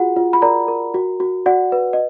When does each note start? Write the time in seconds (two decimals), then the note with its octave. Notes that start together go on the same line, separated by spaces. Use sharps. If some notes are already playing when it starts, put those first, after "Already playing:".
Already playing: F4 F#4 G#4 F#5
0.16 F4
0.33 B5
0.42 A#4 D5 A#5
0.68 A#4
0.94 F#4
1.20 F#4
1.46 F#4 D5 F#5
1.72 B4
1.93 D#5